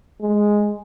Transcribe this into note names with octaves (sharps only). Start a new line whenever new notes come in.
G#3